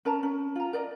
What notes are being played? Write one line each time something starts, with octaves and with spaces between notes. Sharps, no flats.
C#4 A#4 A5 A#5
C#4
F4 A#5
A#4 D5 D#5